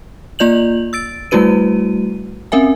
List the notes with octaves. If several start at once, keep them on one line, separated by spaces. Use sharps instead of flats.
A#3 F4 D5 G6 F7 F#7
E6 A6 D7
G3 A3 E4 F#4 B4 D#7
C4 C#4 A#4 E5 G#5